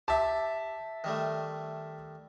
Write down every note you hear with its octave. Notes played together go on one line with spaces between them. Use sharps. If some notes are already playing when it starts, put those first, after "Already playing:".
G4 E5 A5
D#3 G3 A3